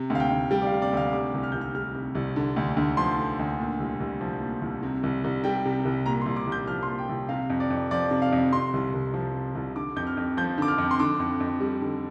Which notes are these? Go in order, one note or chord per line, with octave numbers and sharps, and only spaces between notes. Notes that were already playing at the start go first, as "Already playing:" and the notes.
Already playing: C3
D2
F5
G5
D2
G3 G5
D5
F5
C3
D5
D2 F5
C3 D6
C2
F6
C2 G6
F6
G3 F6
C3
C2
D3
D2
D2
F3 C6
D3
D2
A#2
C2
C2
F3
A#2
C2
C3
C2
C2
G3 G5
C3
C2
A#2 A#5
C6
C2
D6
C2
G6
F3 F6
C6
A#2
G5
C2
C3 F5
F2
D5
F2
F3 D5
C3
F5
F2
C3 C6
C2
C2
F3
C3
C2
D3 D6
F2 G6
F6
F2
F3 G6
D3 D6
F6
F2
C6
D3 D6
F2
F2
G3
D3